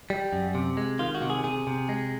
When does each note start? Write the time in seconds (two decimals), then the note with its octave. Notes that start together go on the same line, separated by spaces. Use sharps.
0.10 G3
0.33 F#2
0.55 C3
0.77 G#3
0.99 D#3 F4
1.15 F#4
1.22 C3
1.30 G#4
1.44 C3 G#4
1.67 C3
1.89 G#3